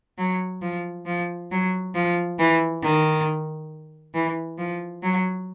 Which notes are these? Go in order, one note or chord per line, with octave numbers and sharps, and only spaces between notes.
F#3
F3
F3
F#3
F3
E3
D#3
E3
F3
F#3